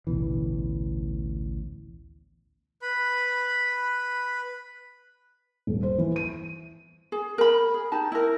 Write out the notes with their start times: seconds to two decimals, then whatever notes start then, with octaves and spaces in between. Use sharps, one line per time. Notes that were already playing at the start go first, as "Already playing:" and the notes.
0.07 A1 D2 B2 E3
2.82 B4 B5
5.67 D#1
5.83 C5
5.98 E3
6.16 D#7
7.12 G#4
7.38 A#4 B5
7.74 G#4
7.92 D#4 G4 A5
8.12 E4 A#4